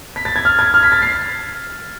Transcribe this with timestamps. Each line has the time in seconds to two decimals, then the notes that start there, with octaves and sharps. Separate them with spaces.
0.16 B6
0.25 A6
0.36 G#6
0.45 F6
0.59 G#6
0.74 F6
0.83 B6
0.92 A6
1.02 C7